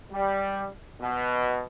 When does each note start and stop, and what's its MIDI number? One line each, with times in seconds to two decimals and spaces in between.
0.13 0.67 55
1.00 1.62 47